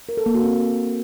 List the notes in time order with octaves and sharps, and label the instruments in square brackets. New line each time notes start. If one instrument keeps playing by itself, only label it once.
[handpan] A#4
A4
A#3
F#4
C4